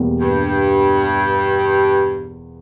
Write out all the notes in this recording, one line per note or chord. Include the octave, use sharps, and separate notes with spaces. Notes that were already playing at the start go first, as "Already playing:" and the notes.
Already playing: E2 B2 G3 A#3
G2